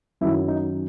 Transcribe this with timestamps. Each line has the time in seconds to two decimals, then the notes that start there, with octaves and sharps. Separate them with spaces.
0.21 F#2 D#3 F#3 E4
0.48 D#4